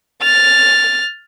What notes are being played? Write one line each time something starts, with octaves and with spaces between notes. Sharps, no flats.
F6 A6